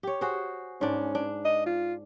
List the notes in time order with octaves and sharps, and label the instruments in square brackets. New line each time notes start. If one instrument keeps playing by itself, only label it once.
[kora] G4 C#5
F#4 G#4 C5
[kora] G#2 D4 [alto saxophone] C#4
[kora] D4
[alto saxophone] D#5
F4